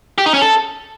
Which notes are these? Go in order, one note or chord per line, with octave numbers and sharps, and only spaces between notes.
G4
D#4
C#4
A4